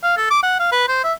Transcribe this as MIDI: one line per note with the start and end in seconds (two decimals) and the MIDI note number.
0.03 0.16 77
0.17 0.27 69
0.30 0.39 86
0.43 0.57 78
0.60 0.70 77
0.72 0.84 71
0.88 1.01 72
1.04 1.13 76